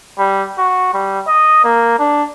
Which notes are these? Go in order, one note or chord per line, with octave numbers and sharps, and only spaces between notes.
G3
F#4
G3
D#5
A#3
D4